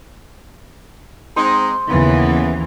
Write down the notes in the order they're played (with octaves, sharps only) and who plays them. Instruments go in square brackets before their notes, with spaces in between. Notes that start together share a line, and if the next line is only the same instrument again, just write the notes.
[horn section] G#3 C4 D#4 [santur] C5
[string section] D#2 C#3 E3 [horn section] B3